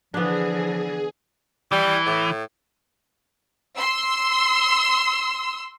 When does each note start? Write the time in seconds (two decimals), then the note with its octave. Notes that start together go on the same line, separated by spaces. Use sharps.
0.14 D3 E3 F3 B3 D4 G#4
1.72 E3 G3
2.06 A2
3.77 C6 E6